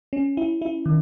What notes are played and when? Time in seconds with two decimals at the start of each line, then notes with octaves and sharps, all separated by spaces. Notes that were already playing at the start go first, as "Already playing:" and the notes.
0.13 C#4
0.37 E4
0.62 E4
0.86 D#3